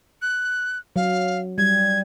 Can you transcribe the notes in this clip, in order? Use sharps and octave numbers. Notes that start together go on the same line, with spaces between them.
F#6
F#3 F5
G3 G#6